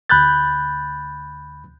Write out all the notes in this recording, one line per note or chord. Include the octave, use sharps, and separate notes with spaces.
D2 B5 F#6 G6 A6